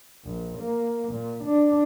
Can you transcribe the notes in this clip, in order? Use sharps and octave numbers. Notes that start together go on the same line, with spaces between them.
A#1
A#3
A#2
D4